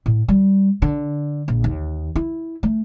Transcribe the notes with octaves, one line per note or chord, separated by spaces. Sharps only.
A2
G3
D3
A#1
D#2
E4
A3